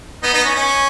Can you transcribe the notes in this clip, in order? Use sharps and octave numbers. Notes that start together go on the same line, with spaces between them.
B3 D#4
B3 D#4
C#4
C#4